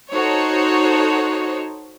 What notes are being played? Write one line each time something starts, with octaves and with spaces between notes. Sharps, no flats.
D#4 F#4 A4 C5 C#5